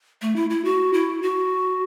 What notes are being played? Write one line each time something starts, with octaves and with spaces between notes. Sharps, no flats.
A3
E4
E4
F#4
E4
F#4